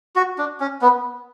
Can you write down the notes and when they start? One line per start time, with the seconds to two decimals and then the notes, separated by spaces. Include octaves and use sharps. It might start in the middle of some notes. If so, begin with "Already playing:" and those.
0.16 F#4
0.38 D4
0.60 C#4
0.82 B3